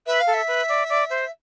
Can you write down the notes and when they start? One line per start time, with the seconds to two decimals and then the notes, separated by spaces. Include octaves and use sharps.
0.07 B4 E5
0.20 F5
0.27 A4
0.34 E5
0.48 B4
0.69 D5
0.90 D5
1.10 C5